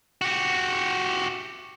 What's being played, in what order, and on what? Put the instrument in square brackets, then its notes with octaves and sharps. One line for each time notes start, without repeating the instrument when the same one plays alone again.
[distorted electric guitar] F#4 G4